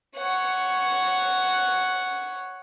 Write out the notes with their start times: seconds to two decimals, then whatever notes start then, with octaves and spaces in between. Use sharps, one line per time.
0.16 C#5 F#5